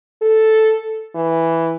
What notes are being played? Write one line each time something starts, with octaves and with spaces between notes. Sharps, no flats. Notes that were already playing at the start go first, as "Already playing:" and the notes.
A4
E3